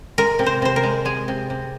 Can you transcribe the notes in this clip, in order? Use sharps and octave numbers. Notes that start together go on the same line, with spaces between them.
G#3 A#4
C3
C5
C3 C5
A#4
G#3
G#3 G#4
C3
C3